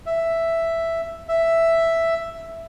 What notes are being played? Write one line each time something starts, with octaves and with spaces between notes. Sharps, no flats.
E5
E5